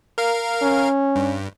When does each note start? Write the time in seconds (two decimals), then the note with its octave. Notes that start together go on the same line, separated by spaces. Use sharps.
0.18 A#4 F5
0.62 C#4
1.16 G2